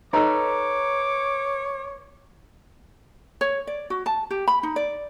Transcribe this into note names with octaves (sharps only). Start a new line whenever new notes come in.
D#4 A4 B4 C#5 A#5 D6
C#5
D5
F#4
A5
G4
B5
D#4
D5